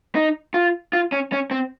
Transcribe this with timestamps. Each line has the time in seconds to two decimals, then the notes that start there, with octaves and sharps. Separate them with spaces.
0.15 D#4
0.54 F4
0.93 F4
1.12 C#4
1.32 C#4
1.51 C4